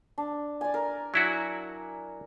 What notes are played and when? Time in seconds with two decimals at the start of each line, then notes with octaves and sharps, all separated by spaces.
0.18 D4
0.61 D5 G#5
0.74 A#4
1.14 F#3 E4 F#4